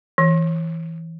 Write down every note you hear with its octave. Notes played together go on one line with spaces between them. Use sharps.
E3